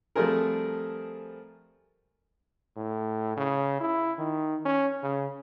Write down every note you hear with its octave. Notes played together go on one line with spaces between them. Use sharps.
F3 G3 A3 C4 G#4 A#4
A2
C#3
E4
D#3
C#4
C#3